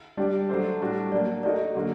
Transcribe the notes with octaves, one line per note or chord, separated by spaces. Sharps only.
G3 D4 G4 D5
F#3 A3 D4 A4 C5
A2 G3 D4 F#4
F#3 A#3 D4 D5
A3 D#4 F#4 A#4 D5 D#5
D3 F#3 A#3 F#4